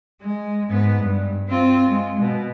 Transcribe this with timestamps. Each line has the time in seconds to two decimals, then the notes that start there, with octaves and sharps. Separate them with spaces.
0.21 G#3
0.69 G#2 B3
1.01 G2
1.49 C4 F4
1.89 G#3
2.20 B2